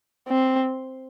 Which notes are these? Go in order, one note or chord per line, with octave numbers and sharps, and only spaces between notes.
C4